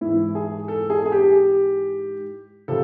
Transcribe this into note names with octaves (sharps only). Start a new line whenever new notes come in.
G#2 E3 E4
G#4
A4
G#4
G#4
G4
C3 F3 A4